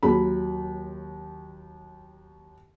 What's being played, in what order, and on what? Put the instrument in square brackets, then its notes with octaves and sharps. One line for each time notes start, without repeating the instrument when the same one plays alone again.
[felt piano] D#2 F#3 B5